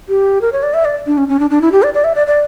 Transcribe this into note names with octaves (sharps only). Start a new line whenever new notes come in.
G4
A#4
C#5
D5
E5
D5
D4
C#4
C#4
D4
D4
E4
G4
D5
D5
E5
D5
D5